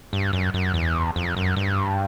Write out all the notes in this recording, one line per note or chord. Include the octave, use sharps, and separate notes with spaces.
G2
F#2
F#2
E2
F2
F#2
G2